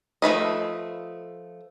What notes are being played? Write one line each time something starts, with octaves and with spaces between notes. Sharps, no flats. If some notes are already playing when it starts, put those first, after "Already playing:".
F3 A3 B4 D#5